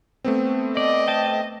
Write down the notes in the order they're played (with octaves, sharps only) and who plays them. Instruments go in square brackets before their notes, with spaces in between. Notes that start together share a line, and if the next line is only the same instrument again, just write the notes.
[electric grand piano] A3 B3 C4
[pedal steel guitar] D5 [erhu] D#5
[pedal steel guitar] G5 A5